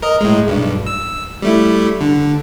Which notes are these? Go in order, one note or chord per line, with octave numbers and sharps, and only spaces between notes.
A#4 D#5
A2 G#3
B1 G2
E6
G3 A3 E4
D3